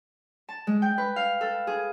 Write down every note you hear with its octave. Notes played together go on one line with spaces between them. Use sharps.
A5
G#3
G5
B4
F5
A4
G#4